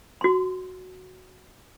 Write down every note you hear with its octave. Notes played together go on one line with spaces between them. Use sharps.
F#4 C6